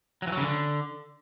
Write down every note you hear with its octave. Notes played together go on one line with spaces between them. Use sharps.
F#3
E3
F#3
C#3
D3